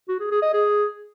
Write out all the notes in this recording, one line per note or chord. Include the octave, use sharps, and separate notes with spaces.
F#4
G#4
G#4
D#5
G#4